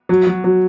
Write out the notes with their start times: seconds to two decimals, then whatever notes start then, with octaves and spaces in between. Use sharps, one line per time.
0.09 F#3
0.27 F#3
0.44 F#3